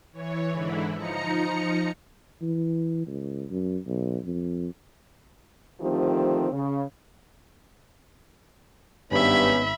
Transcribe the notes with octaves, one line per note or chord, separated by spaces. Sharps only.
E3 C#5
G#2 D3 E3 E4
F3 D#4 A#5 C#7
E3
C#2
F#2
B1
F2
D3 D#3 F3 A3 C4 G4
C#3
G#1 G2 B3 C#4 D#4 E5 B5